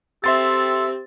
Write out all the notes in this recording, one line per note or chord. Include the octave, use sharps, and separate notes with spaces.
C4 G4 A4 E5 C6 A6